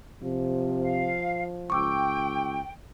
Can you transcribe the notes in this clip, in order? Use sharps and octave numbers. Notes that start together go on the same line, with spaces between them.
C3 F3
F5
C#2 G5 C#6 D6 E6